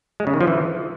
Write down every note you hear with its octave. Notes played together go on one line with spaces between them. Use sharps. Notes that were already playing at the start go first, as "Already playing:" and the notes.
G#3
C#3
D#3
F3
E3